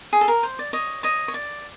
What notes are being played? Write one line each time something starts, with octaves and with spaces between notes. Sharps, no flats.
G#4
A4
A#4
C5
D5
C#5 D#5
C#5 D#5
C#5
D5